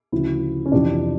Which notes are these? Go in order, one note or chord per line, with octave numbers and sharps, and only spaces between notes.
D2 C#3 F3 E4
C#4
F2 C3 E3 D4